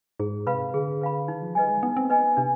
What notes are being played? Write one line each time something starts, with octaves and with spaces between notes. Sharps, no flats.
G#2 G#4
C3 B4 F5 B5
D3 G#4
B4 F5 B5
D#3 D#4
F3
G3 B4 D#5 G#5
G#3
B3 D#4
C4
B3 B4 D#5 G#5
C3 D4